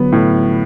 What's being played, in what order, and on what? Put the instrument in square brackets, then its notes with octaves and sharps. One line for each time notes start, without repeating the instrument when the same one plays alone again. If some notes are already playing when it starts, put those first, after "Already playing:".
Already playing: [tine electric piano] D3 F#3 [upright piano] B3
[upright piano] A2